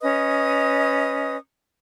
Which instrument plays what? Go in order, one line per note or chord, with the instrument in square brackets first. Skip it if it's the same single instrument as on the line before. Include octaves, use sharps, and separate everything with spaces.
[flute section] C#4 B4 D#5 D#6